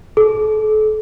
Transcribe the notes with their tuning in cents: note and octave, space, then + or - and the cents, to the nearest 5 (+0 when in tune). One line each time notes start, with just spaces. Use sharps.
A4 -35